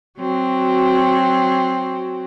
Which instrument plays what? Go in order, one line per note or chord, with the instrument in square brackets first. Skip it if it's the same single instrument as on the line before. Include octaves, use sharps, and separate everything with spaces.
[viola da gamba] F#3 C4 F#4